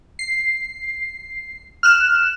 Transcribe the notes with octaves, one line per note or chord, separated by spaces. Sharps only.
C7
F6 F#6 E7